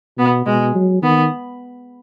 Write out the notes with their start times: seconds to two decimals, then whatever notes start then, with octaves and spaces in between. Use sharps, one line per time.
0.18 B2 B3
0.46 B2 G#3
0.74 F#3
1.02 D#3 B3